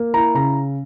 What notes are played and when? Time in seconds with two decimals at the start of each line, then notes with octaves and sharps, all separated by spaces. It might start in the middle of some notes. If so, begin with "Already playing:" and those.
Already playing: A#3
0.14 E4 A#5
0.34 C#3 A#5